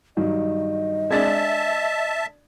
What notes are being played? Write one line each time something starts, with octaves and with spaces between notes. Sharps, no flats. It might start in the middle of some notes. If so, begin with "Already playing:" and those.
G2 D#3 F#3 D#5
G#3 D4 E5 A5 G#6 A6